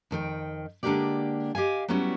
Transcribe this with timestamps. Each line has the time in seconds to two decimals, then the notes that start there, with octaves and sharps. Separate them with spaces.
0.11 F2 D#3 A4 G5
0.83 D3 G#3 A#3 D4 G4 D5
1.55 G4 D#5 F5 G#5
1.88 F#3 G3 B3 C#4 E4 F#4